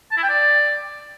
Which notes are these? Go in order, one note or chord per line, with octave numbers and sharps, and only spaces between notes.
A5
E4
G5
D5